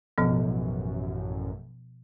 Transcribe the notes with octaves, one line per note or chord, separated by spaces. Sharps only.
A1 F#2 B2 F3 B3